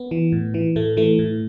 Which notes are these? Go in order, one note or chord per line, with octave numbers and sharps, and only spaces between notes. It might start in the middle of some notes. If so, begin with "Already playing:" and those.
Already playing: B3
E3
A2
E3
A2 A3
E3 A3
A2